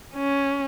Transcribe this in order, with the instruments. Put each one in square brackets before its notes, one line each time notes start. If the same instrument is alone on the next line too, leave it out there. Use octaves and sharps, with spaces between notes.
[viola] C#4